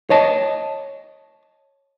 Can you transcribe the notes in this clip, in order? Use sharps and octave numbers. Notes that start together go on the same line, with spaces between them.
C#5 D#5 A5